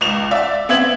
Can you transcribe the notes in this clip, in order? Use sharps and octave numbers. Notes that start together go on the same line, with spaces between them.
C#2 E7 F7
D5 E5
B3 C4 E5 G#6 F#7